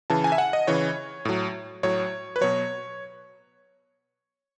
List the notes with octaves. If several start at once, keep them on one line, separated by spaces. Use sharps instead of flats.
C#3 E3 A5
G#5
E5
F#5
D#5
C#3 E3 C#5
A2 F#3
A2 F#3 C#5
B4
B2 F#3 C#5